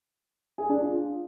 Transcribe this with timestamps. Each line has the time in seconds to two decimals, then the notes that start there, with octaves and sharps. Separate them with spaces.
0.58 G#4
0.69 D4
0.81 F4